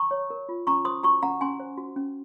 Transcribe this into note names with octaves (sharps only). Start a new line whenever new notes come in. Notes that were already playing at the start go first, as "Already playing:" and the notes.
Already playing: A#5 C#6
C#5
A#4
F4
C#4 A#5 C#6
C5 C6 D#6
F#4 A#5 C#6
C#4 F#5 A#5
C#4 G#5 C6
C5
F#4
C#4